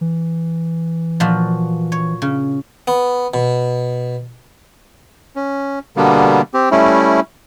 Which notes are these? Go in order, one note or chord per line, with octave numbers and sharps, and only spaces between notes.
E3
A#2 F3 F#4
C#5
C#3
B3
B2
C#4
B2 D3 G3 A#3 B3
C4 G4
G3 A3 C#4 E4